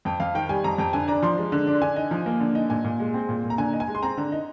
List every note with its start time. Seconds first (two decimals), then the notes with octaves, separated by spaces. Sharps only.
0.05 F2 G5
0.20 F2 F5
0.35 D#3 G5
0.49 G3 G#5
0.64 F2 A#5
0.78 F2 G5
0.93 D3 G#5
1.08 D4 A#5
1.23 F3 C6
1.38 G#3
1.52 D3
1.67 D4
1.82 D3 G#5
1.96 D#4
2.11 F3
2.26 A#3
2.40 D3
2.55 D#4
2.70 A#2 G#5
2.85 A#2
3.00 G#3
3.14 C4
3.29 A#2
3.44 A#2
3.50 A#5
3.58 D3 G#5
3.73 D#4
3.80 G#5
3.88 G#3
3.95 C6
4.02 C4 A#5
4.17 D3
4.32 D#4